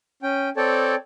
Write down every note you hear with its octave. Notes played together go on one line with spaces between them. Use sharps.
C#4 G5
C4 A4 C#5 D5 G5 A5